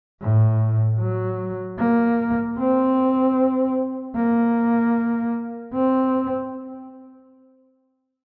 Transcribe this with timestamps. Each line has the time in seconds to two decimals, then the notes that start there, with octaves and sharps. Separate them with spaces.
0.21 A2
1.00 F#3
1.79 A#3
2.58 C4
4.16 A#3
5.73 C4